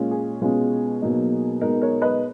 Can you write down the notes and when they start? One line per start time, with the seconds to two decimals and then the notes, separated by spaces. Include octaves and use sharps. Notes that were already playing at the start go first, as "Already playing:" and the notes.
Already playing: A#2 G#3 C#4 F4
0.11 G#4
0.41 B2 G#3 C#4 F4
1.02 B2 F#3 A#3 D#4
1.61 B2 G#3 D#4 A#4
1.82 A#4 C#5
2.02 B4 D#5